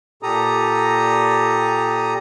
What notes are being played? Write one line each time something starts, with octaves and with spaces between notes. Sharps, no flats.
A#2 G4 A4 A#5 D#6